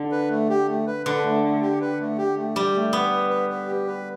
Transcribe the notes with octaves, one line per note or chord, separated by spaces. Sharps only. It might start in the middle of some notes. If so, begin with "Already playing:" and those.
Already playing: D3
B4
A3
G4
A3
B4
D3 B4
A3
A3
G4
B4
A3
G4
A3
G3 G4
A3
B3 B4
B4
B4
B4
G4
B4